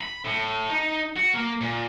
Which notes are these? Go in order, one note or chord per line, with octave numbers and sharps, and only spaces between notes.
B5
A2
D#4
F#4
A#3
A#2